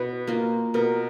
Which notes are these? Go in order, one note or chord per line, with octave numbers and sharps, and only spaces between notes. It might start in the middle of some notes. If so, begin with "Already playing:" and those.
Already playing: B2 B4
A#3 F4
B2 A#4